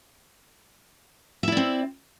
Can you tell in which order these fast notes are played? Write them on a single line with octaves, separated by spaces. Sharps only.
E5 E4 D5 C4